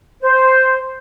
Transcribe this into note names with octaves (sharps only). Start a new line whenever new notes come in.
C5